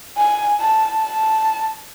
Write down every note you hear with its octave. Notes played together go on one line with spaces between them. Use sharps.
G#5
A5
A5